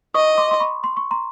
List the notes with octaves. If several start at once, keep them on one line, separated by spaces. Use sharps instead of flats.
D#5 C#6 D#6
C6 D6
C6
B5 C#6
C6
C#6
A#5 C6